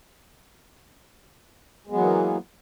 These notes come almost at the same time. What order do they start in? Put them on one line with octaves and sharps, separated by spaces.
G#3 B3 F#3 E3 A#3